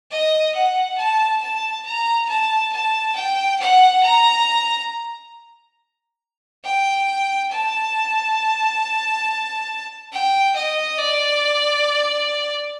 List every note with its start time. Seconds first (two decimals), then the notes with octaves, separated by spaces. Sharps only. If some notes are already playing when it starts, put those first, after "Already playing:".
0.11 D#5
0.55 F#5
0.98 A5
1.42 A5
1.85 A#5
2.29 A5
2.72 A5
3.15 G5
3.60 F#5
4.03 A#5
6.63 G5
7.51 A5
10.12 G5
10.55 D#5
10.98 D5